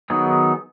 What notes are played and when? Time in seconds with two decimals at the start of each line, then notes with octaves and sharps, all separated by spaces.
0.10 D#3 F#3 B3 D#4 G#4